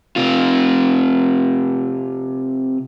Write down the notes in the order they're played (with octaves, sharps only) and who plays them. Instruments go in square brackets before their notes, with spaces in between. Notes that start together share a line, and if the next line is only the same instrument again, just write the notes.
[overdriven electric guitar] C3 F4